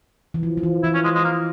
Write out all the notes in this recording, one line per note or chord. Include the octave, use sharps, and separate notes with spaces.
E3
F3
F3
E3
E3 E4
C#4
G#3
G#3
A#3